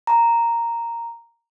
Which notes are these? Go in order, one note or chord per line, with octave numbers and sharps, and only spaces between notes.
A#5